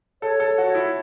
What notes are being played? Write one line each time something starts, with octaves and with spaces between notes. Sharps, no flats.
A4 C#5
A4
F#4
E4